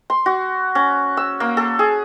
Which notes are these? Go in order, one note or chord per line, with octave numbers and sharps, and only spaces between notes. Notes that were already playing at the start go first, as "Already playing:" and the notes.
C6
F#4
C#4
E6
A#3
A4
G#4